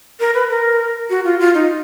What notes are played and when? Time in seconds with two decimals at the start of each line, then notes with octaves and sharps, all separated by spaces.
0.20 A#4
0.34 B4
0.50 A#4
1.10 F#4
1.24 F4
1.40 F4
1.54 D#4